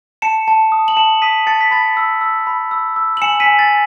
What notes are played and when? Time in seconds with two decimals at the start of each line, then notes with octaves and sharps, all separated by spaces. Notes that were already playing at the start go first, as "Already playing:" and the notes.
0.22 A5 C#7 E7
0.48 A5
0.72 D#6
0.88 F#7
0.97 A5 C#7 E7
1.22 D#6 B6 D#7
1.47 A5 A6 C#7
1.61 B6
1.71 B5 A6 C#7
1.97 E6
2.21 E6
2.47 B5
2.71 E6
2.96 E6
3.17 F#7
3.22 G#5 C#7 E7
3.40 B6 D#7
3.46 G#5
3.59 A6